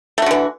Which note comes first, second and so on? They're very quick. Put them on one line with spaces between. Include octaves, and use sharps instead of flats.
A3 F#4 D3 E3